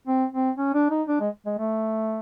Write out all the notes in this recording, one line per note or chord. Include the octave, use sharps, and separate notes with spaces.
C4
C4
C#4
D4
D#4
D4
G#3
G#3
A3